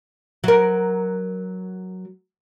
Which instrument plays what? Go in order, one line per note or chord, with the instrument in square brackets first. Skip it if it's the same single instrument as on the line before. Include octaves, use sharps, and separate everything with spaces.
[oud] F#3 A#4